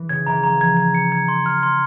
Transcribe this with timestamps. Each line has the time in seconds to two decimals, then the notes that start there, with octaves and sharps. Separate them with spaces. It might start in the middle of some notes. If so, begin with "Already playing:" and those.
Already playing: E3
0.09 C#3 G#6
0.27 E3 A#5
0.43 F3 A#5
0.61 G#6
0.77 G#6
0.95 C#7
1.12 G#6
1.28 C6
1.46 F6
1.63 C6